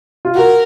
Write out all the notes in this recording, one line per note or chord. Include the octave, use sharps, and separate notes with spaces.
F4
F#4 A#4